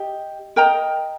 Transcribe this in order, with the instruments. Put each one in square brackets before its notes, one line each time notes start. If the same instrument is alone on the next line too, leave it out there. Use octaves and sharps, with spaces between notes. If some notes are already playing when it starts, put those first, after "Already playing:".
Already playing: [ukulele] G4 D#5
A#4 D#5 G5 A#5